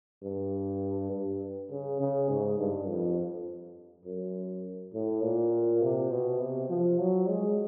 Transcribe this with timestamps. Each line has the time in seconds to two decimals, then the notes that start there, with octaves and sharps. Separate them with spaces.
0.23 G2
1.11 G2
1.71 C#3
2.00 C#3
2.29 G#2
2.58 G2
2.88 F2
4.05 F#2
4.94 A2
5.23 A#2
5.82 C3
6.11 B2
6.41 C3
6.69 F3
6.99 F#3
7.29 G#3